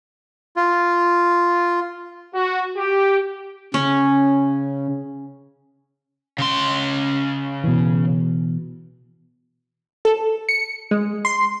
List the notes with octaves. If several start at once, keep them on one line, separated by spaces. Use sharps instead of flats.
F4
F#4
G4
C#3 C#4
C#3 C6
B2 E3
A4
C#7
G#3
C6